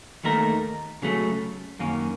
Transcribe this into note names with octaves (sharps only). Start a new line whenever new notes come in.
D#2 D#3 A3 D#4 A#4
C#3 F#3 A3 C#4
F#2 D#3 A#3 C#4